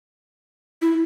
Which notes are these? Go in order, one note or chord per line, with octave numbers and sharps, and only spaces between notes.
E4